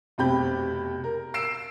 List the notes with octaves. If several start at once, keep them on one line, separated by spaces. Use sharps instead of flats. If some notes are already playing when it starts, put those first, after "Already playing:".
F1 B2 C4 G4 B5 G6
A#4
E6 C7 D7 E7